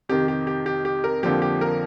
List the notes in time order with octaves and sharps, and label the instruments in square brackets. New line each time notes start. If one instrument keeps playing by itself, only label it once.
[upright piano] F2 C3 D#3 G4
G4
G4
G4
G4
A#4
F2 D3 F3 A#3 G4
G4
A#4